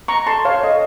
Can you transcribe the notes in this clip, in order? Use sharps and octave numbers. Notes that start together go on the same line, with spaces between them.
A#5 C#6
A4 A5 C6
C#5 F5
A4 D#5